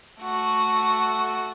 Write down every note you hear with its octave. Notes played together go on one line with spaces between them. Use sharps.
A3 F#4